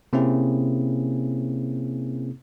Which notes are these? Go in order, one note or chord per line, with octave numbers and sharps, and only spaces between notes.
C3 A#3 C4 C#4 E4 G#4